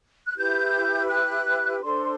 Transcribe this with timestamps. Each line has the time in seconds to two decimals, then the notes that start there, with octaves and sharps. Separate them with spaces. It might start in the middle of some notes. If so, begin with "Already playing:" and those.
0.25 F#6
0.36 E4 G4 B4 G6
1.08 F#6
1.81 D4 A4 C5 C6